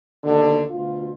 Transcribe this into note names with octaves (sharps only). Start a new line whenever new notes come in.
D#2 B2 D3
D2 B2 F4